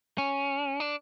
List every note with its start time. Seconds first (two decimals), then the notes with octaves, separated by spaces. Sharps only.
0.18 C#4
0.80 D4